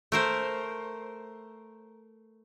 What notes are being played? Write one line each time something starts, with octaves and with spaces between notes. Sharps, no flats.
A3 A#4 C5